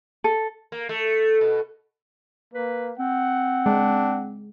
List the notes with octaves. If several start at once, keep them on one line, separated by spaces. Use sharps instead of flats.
A4
A#3
A3
B2
A#3 B4
C4 F#5
G#3 D4